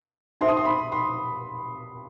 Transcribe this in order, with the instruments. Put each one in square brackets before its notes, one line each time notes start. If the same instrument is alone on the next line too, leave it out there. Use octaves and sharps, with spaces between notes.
[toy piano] D#4 F#4 A4 C5 E5 [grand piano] C6
[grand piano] D#6
C6
B5
C6